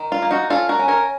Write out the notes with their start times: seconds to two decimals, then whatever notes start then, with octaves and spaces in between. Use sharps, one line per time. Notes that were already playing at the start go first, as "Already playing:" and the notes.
Already playing: D#3
0.12 F4
0.22 A#3
0.31 D#4 F#4
0.50 C#4 F4 A4
0.69 F#4 A#4
0.79 C#4
0.88 A#4 C#5